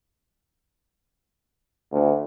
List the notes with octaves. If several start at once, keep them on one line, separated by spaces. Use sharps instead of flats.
D2